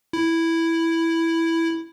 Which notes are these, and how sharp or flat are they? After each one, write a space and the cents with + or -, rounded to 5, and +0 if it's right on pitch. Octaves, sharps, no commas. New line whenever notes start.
E4 +0